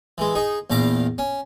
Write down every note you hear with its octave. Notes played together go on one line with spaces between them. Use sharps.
E3 G#3
D#4 G#4
A#1 E2 F5 A#5 D6
C#4